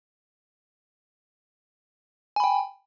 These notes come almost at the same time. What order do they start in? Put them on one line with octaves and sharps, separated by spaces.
G#5 B5 G5